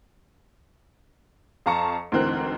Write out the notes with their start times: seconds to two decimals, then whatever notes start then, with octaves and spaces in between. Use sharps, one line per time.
1.66 F2 F5 A5 A#5 C#6 C#7
2.12 D2 G#2 E3 C4 A#4 F#6